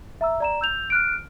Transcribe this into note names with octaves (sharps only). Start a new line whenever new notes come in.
E5 A#5 E6
D5 A#5 E7
E6 G6 F7
F6 F#6 D7